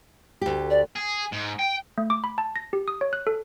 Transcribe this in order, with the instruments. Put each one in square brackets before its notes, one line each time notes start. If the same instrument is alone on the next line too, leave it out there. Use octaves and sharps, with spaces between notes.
[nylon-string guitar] D2 G4
[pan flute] D5
[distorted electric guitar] G#4
G#2
G5
[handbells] A3
D6
B5
A5
A#6
G4
D#6
C#5
F#6
A4